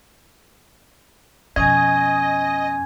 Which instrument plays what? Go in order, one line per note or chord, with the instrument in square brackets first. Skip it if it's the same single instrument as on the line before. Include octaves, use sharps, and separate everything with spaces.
[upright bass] F2 B2 [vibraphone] C#4 G#5 [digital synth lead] D#5 [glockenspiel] G#6